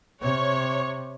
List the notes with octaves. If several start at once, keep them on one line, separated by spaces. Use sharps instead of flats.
C3 C#5